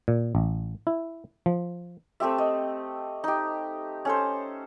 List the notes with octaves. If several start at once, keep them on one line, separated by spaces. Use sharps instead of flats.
A#2
A1
E4
F3
A3 C4 G4 E5
D#5
D#4 G4
C#4 A4 C5